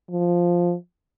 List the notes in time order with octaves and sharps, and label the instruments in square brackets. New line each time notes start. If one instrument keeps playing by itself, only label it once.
[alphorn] F3